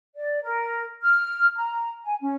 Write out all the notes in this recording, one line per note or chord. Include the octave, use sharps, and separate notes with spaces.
D5
A#4
F6
A#5
G#5
C#4